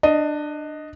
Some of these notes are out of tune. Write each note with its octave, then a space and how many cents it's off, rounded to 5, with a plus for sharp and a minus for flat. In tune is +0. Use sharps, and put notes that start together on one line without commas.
D4 +20 D#5 +0